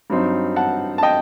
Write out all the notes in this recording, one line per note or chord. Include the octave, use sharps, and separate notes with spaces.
G2 F#3 C4 D#4
F#5 A5
A5
D#5 G5